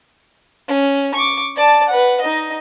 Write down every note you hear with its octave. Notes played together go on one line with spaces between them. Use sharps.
C#4
C#6 D6
D5 A5
B4 F#5
D#4 D#5